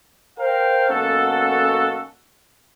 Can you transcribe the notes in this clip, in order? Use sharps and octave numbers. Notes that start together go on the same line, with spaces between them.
A#4 C5 F5 G5
B1 B2 A#3 C#4 F#4 A4